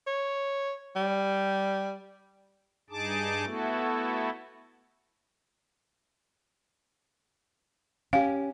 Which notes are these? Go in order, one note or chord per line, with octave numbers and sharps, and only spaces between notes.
C#5
G3
G2 D#4 G#4 A5 D6
A3 B3 E4 F#4 A4
C#4 G4 F5